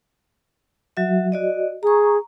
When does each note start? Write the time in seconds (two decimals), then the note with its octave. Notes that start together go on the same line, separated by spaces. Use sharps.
0.97 F#3 F#4 E5
1.32 F#4 D5 D#5
1.83 G#4 A#5 C#6